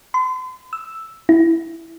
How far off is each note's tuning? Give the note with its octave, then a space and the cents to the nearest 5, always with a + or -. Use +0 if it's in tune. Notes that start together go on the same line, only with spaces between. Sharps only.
C6 -40
E6 +0
E4 +0